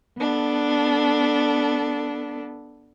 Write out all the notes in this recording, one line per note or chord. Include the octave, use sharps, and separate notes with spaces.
B3 D4 A4